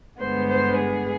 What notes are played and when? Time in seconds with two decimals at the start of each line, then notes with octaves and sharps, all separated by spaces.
0.19 G2 D3 G#3 B3 C5
0.48 C5
0.77 G#4